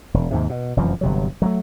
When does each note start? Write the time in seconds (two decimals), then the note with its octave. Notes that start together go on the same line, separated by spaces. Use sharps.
0.14 E1
0.30 D#2 G#2 C3
0.50 B2
0.77 F1 F#2 E3 F3
1.01 G1 C3 F#3
1.42 F#3 G#3 A3